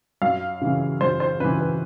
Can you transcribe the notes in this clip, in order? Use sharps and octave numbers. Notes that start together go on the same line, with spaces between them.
F#2 F5
C#3 E3
F#2 C5
C5
C#3 E3 B4
B4